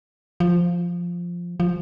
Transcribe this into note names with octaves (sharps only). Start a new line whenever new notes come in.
F3
F3